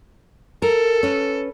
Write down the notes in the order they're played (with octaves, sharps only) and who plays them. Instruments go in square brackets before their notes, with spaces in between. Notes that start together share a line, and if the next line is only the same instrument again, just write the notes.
[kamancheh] A4 [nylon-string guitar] A#4
[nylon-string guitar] C#4 B4